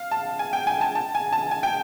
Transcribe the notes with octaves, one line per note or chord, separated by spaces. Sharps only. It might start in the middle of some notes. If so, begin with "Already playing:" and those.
Already playing: F5
A5
G#5
G5
G#5
A5
A5
G#5
A5
G#5
G5